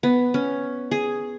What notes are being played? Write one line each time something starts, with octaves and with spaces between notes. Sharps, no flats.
B3
C#4
G#4